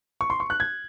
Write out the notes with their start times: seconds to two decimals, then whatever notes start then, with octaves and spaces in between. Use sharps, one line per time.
0.21 C#6
0.30 C6
0.40 C#6
0.50 F#6
0.60 G#6